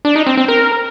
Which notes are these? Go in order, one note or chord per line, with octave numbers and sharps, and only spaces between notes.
D4
D#4
C4
C4
A#4